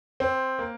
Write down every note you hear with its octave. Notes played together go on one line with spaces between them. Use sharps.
C4
A#3